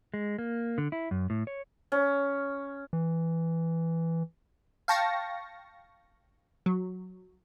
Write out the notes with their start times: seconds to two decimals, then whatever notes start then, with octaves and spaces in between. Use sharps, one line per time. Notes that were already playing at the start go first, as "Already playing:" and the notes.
0.14 G#3
0.39 A#3
0.78 D3
0.92 E4
1.11 F#2
1.30 A2
1.47 C#5
1.92 C#4
2.93 E3
4.88 F5 G5 A5 C#6 A#6
6.66 F#3